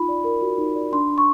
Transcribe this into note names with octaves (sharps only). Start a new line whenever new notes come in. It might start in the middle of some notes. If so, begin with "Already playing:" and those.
Already playing: D#4 F4 B5
D5
A#4
F#4
D#4
D5
D4 C6
D4
C#6